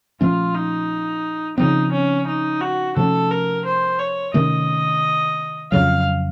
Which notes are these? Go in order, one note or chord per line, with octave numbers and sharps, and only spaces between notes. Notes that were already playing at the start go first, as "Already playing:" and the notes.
A#2 F3 A3 C#4 F4
D#4
C#3 F3 C4 D#4
C#4
D#4
F#4
C3 F3 A3 C#4 A4
A#4
C5
C#5
C3 D#3 A3 C#4 D#5
F2 C#3 F#3 F5